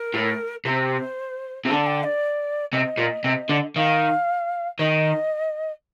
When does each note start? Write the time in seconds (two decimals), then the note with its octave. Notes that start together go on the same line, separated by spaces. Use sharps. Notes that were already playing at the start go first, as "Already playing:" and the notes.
Already playing: A#4
0.14 A2
0.65 C3 C5
1.65 C3
1.69 D3 A5
1.87 G5
2.03 D5
2.73 C3 D#5
2.98 A#2
3.24 C3
3.49 D3
3.76 D#3 F5
4.79 D#3 D#5